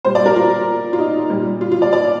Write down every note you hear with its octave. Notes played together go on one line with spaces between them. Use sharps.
A#2 G3 C5
D5
A#4
F4
F4
D#4
A#2 G3
F4
F4
D5
D5